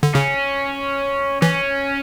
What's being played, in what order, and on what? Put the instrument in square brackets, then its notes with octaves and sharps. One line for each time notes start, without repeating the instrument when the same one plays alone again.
[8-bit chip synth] D3
[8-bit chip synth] C#3 [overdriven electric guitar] C#4
[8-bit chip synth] E3 [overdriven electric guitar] C#4